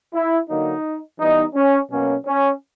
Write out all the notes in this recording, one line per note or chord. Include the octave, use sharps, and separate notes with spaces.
E4
D3 F#3 A#3 D#4
E3 G3 B3 D#4
C#4
B2 F#3 A#3 C#4
C#4